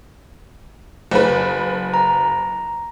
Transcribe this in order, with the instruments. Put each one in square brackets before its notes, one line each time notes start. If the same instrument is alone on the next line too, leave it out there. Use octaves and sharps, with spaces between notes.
[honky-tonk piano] F#1 B4
[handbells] A#5